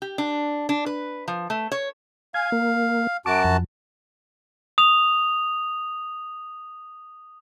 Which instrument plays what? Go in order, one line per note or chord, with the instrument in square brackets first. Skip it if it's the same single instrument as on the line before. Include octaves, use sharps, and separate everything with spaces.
[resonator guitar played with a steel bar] G4
D4
D4
B4
F3
A3
C#5
[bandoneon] F5 [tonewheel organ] G#5
[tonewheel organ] A#3
[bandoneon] F#2 F#4 A5 [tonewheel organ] D6
[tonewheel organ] F2
[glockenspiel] D#6 F7